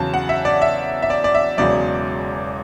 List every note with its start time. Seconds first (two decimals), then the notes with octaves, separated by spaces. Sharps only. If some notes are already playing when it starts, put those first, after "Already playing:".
Already playing: E2 C#3 F#3 A5
0.14 F#5
0.29 E5
0.45 D5
0.62 E5
1.02 E5
1.10 D5
1.24 D5
1.35 E5
1.58 E1 E2 C#3 F#3 D5